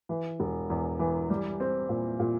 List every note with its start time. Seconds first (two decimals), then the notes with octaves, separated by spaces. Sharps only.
0.09 E3
0.40 E1
0.70 E2
0.99 E3
1.30 G3
1.60 C4
1.89 A#2
2.20 A#2